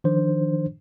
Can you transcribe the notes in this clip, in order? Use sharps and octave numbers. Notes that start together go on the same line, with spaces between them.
D#3 F3 D4 C5